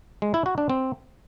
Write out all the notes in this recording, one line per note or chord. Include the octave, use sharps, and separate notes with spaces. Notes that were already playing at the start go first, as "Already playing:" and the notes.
G#3
E4
F#4
D4
C4